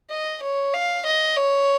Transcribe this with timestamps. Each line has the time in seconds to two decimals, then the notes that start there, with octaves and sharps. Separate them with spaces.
0.10 D#5
0.42 C#5
0.74 F5
1.06 D#5
1.37 C#5